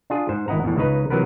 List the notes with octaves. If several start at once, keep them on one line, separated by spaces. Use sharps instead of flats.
D4 F4 G#4
G#2 C5
G#1 E4 D#5 F#5 A#5
E2 A2
C#2 C#3 D#4 B4 A#5
C3 E3 F#3 B3 A#4 B4